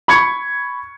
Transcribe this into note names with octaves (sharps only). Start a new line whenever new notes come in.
B5 C#6 G#6 C#7